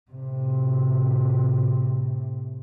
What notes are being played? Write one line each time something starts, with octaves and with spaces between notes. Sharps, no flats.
A2 C3